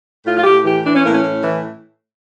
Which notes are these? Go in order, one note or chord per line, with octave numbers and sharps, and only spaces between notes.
A2 F4
F4
A2 G4
E3 G4
E3 D4
C#4
A2 A#3
C#4
A2
E3